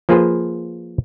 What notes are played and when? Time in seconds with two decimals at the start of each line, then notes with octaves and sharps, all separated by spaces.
0.09 F3 A#3 F4 G#4 B4 C5